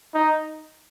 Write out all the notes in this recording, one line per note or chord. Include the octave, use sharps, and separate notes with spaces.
D#4